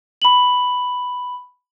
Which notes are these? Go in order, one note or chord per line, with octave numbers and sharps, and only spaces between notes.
B5 F#7